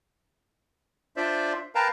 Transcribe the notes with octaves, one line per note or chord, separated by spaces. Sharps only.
D4 F4 C5 D5 E5
A#4 B4 F5 G5 A5 A#5